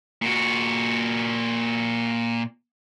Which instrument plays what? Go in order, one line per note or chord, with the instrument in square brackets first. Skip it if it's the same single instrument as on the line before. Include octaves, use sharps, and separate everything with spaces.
[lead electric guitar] A#2 F#4